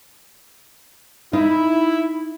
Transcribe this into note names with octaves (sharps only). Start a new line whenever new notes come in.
D#4 E4